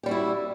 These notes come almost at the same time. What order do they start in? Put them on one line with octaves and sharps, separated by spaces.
G4 G3 F#4 E4